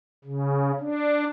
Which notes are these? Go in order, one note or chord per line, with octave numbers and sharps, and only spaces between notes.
C#3
D4